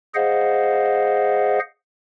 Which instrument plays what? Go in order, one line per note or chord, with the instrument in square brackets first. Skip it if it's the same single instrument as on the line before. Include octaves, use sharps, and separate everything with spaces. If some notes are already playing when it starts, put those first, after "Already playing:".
[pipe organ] G#4 C5 D#5 F5 F#5